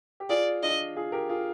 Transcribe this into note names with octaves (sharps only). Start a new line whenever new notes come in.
G4
F4 G#4 D5
D4 F4 D#5
F4 G#4
G4 A#4
F4 G#4